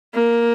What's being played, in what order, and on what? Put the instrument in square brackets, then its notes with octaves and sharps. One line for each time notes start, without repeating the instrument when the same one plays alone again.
[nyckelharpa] A#3